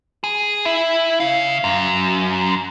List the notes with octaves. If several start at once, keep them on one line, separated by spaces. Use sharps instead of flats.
G#4
E4
C#3 F5
F#2